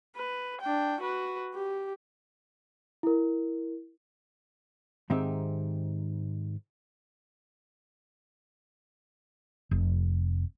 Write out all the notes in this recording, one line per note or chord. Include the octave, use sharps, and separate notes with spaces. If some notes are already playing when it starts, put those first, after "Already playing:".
B4
D4 G5
F#4 B4
G4
E4 A#4
G#2 D#3 C4 D#4 G4 E5
F1